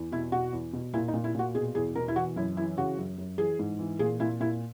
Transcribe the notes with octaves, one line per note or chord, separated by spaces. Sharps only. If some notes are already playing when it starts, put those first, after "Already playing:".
Already playing: E2
B2 E4
B2 F#4
E2
B2
A#2 E4
D#4
A#2
E4
A#2 F#4
B2 G#4
E2 G#4
B2 A#4
E4
E3 F#4
F#2 E4
E3 E4
C#3 F#4
F#2
F#2
E3 G#4
G#2
E3
A#2 G#4
A#2 E4
A#2 E4